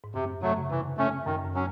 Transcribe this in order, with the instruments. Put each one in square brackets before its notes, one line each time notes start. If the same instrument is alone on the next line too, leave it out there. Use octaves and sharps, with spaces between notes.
[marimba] G#2
[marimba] F#2 [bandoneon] C3
[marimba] F#2
[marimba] C3 [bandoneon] F#3 A3
[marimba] C#3
[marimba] C3 [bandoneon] E3
[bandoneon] A3 C#4
[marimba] F#2 [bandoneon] D#3
[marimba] F#2
[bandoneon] F#3 C#4